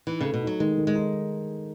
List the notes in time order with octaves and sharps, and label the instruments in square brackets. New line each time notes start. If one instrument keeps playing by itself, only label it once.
[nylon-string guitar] E3 [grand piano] D#4
[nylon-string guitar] C#3 [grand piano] A3
[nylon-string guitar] B2
[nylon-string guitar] F#3 [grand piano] D#4
[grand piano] D#3 [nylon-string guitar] G#3
[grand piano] D#3
[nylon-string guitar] G#3
[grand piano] D#4